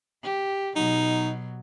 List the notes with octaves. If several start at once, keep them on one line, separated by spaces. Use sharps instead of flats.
G4
B2 F#3 D#4